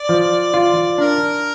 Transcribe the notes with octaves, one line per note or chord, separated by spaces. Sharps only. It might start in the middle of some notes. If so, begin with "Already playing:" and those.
Already playing: D5
F3
F4
D4 A#4